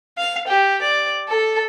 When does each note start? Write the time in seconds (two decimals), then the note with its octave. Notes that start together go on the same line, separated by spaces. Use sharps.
0.18 F5
0.47 G4
0.81 D5
1.28 A4